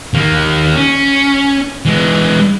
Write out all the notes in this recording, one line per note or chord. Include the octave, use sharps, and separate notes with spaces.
D#2 A#3
C#4
E3 G#3